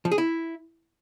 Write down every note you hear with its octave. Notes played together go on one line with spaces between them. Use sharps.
F3
G#4
E4